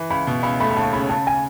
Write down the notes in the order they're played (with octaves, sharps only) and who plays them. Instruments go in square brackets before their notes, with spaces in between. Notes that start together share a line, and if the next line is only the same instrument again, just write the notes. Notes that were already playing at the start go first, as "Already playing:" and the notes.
Already playing: [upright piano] E3
[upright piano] C#2 [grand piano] B5
[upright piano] B2
[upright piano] C#2 [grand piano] B5
[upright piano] A3 [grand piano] B5
[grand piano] B5
[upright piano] D#2 [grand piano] A5
[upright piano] C#3 [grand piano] B5
[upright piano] C#3 [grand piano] A5
[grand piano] G#5